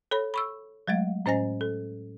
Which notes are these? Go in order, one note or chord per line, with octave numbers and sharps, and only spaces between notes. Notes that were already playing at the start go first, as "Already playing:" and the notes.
A4 C#5 B5
B5 C#6 E6
F#3 G#3 A3 F5
A2 C#4 C5 D#5 G#5 A#6
A4